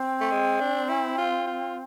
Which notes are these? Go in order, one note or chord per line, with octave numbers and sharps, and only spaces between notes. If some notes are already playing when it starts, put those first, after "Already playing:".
Already playing: C4
A3
G#3
D4
E4
F4
F4